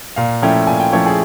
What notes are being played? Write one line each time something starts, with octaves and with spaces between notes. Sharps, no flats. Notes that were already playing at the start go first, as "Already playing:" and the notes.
A#2 F5
F3 A3 C#4 E4 G5
A#2 G#5
G5
F3 A3 C#4 E4 C#5
G#4